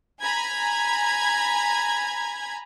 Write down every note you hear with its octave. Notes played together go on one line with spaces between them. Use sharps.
G#5 A#5 B5 G#6